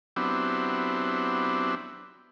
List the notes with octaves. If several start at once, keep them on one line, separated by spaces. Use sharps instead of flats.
F#3 B3 C4 D4 E4 G4